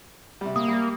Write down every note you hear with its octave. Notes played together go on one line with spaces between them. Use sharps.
C3 G3
A#3 D#6
G3